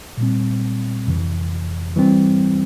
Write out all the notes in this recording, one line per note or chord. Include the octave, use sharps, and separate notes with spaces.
A#2 G3 C4
F2 C3 E3
E3 G3 C4